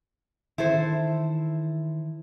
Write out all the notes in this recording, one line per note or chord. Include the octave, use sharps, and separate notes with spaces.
D#3 E3 E4 A4 C5